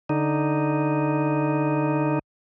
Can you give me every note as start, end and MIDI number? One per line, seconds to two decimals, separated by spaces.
0.09 2.19 50
0.09 2.19 63